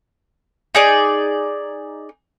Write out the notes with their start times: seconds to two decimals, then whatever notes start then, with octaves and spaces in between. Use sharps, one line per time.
0.75 D#4 G#4 D5